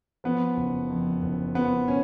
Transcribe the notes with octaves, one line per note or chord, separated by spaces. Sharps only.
F3 B3
F#1
F2
F#1
F3 B3
C#4